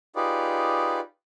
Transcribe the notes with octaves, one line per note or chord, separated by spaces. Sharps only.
D#4 F4 G4 G#4 B4 D5